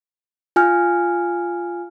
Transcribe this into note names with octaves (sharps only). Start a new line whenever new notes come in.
F4 G#5 F6